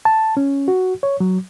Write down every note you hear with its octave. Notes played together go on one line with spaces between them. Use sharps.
A5
C#4
F#4
C#5
F#3